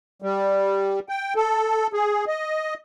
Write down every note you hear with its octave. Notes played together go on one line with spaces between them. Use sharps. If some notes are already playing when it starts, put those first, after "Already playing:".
G3
G5
A4
G#4
D#5